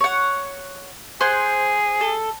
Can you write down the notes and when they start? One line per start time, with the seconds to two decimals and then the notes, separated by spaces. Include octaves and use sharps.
0.01 C#5 F#5
1.21 G#4 C5 F#5 G#5
2.01 A4